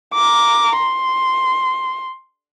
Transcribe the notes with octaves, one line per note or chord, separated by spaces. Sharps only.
A#5 D6
C6